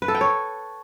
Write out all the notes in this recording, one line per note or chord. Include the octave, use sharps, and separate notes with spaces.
B4
A4
G5
C#5